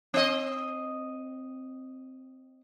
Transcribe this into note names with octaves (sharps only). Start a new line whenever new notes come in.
C4 D#5